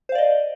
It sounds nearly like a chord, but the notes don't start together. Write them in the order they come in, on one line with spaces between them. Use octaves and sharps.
C5 F5 D5 D#5